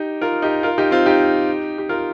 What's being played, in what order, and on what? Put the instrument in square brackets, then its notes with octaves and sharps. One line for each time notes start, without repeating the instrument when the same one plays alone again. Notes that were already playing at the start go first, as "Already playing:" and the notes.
Already playing: [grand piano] D#4 G4
F4 A#4
D#4 G4
F4 A#4
D#4 G4
C4 F4
D#4 G4
G4
F4 A#4